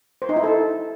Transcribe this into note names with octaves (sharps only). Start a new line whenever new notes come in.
C5
D#4
E4
A4